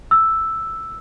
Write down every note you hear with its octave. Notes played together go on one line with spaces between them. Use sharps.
E6